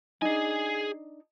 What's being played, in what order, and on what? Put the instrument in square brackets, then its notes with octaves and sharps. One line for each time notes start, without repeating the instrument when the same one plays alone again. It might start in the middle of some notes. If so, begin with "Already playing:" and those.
[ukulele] D4 D#4 [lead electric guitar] G#4 G#5